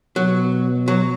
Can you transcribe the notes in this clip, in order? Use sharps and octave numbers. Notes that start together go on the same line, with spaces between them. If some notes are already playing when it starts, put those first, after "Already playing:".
B2 F#3
F#3